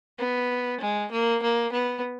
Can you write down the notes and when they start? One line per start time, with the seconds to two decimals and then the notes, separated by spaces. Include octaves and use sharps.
0.19 B3
0.80 G#3
1.11 A#3
1.43 A#3
1.72 B3